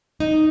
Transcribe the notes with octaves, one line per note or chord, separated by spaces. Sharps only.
D#4